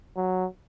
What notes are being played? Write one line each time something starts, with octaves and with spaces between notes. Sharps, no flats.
F#3